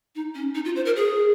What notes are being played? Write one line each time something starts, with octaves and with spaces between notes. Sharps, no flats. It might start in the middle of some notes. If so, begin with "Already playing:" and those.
D#4
C#4
D#4
F4
C5
A#4
G#4